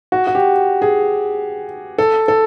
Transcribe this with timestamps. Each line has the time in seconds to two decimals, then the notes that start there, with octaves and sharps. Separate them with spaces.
0.12 F#4
0.27 F#4
0.35 G4
0.82 G#4
1.98 A4
2.28 A4